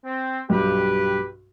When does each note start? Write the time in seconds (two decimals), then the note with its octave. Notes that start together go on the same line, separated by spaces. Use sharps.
0.05 C4
0.50 B1 G2 G4 B4